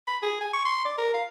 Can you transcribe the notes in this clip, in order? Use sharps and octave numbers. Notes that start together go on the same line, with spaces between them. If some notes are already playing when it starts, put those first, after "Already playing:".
B5
G#4
G#5
C#6
C6
D5
A#4
F5